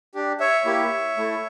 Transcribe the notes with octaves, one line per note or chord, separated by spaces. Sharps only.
D4 G4
C#5 E5
A#3 E4 G4
A3 E4 A4